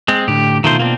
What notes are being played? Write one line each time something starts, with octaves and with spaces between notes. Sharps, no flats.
G#3 C4
A2 D3 G4
B2 D#3 A3 F4 C5
A#3 C4 D4